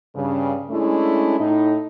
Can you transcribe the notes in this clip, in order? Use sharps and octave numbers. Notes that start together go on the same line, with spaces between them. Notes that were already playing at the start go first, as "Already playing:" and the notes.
G2 C#3
G#3 A3 C#4 D4 E4
A2 D#4